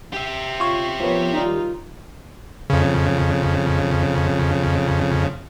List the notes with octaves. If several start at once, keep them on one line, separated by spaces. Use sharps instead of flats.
G4 E5
F4 C#5
F3 B3 A#4 C#5
D#3 G3 D#4 F4
F2 C#3